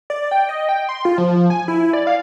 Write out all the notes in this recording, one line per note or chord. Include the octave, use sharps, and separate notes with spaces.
D5
G5
D#5
G5
C6
F4
F3
G#5
E4
D5
F5